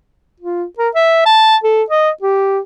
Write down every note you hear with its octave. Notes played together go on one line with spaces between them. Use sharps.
F4
A#4
E5
A5
A4
D#5
G4